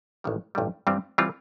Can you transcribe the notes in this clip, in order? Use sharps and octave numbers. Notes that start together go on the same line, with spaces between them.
A1 G2 D#3 G3
A1 G2 D#3 G3
G2 E3 G3 C4 F4
E3 G3 C4 F4